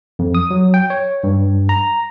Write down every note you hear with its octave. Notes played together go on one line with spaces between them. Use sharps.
F2
D#6
F#3
G5
C#5
G2
A#5